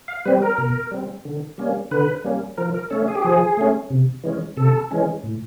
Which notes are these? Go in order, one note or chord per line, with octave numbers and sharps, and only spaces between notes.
F5
G3 C4 B4
A#4
B2
G3 C4
D3
G3 A#3 C#4
D3 B4
G3 A#3 C#4
F3 A#4
A#4
A3 C#4 A4
G#4
G4
F3 G#4
A3 C#4
C3
E3 G#3 C#4
C3 A4
E3 G#3 C#4
A2